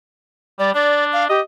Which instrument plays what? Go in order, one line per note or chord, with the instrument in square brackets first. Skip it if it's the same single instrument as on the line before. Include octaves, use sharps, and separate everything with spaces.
[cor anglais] G3 [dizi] D5
[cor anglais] D4 [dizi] D5
[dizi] F5
[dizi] G4 [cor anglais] D#5